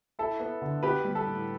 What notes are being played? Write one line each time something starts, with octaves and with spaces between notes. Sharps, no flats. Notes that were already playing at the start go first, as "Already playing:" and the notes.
E4 A4
B3
D3
B3 G4 B4
G3
A4
A2